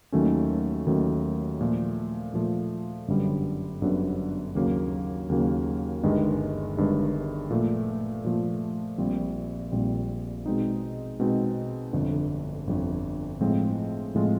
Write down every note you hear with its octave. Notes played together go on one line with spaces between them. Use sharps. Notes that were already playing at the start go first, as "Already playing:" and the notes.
D#2 D#3 F#3 A3 C#4
D#2 D#3 F#3 A3 C#4
A#2 F3 A3
A#2 F3 A3
G1 F#2 D3 G3 B3
G1 F#2 D3 G3 B3
D#2 C#3 F#3 A#3
D#2 C#3 F#3 A#3
G1 G2 D#3 G#3
G1 G2 D#3 G#3
A#2 F3 A3
A#2 F3 A3
A#1 A#2 G3 C4
A#1 A#2 G3 C4
B2 G#3 C4 D#4
B2 G#3 C4 D#4
G1 F2 D3
G1 F2 D3
A2 F3 G#3 C4 F4
A2 F3 G#3 C4 F4